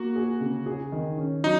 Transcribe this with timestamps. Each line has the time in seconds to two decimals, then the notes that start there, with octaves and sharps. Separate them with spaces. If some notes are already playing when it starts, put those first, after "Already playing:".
Already playing: A#3 F#4
0.16 G#4
0.41 C#3
0.66 G#4
0.92 D#3
1.18 C#4
1.44 F#3 D#4